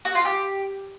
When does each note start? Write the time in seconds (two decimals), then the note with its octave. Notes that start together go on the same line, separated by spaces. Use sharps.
0.05 F#4
0.15 F4
0.25 G4